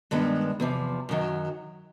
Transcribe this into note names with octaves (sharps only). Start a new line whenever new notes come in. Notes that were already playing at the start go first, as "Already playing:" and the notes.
G2 D#3 G#3 B3 D4
E2 C3 F3
F#2 D#3 F#3